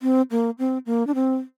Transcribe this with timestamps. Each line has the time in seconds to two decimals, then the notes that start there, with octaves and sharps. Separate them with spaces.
0.02 C4
0.31 A#3
0.59 C4
0.86 A#3
1.07 D4
1.15 C4